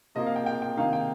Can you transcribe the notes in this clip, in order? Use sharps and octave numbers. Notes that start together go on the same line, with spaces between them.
C3 F3 A#3 F4 D#5
F5
G5
G5
G5
C3 D#3 A#3 D#4 F5
G5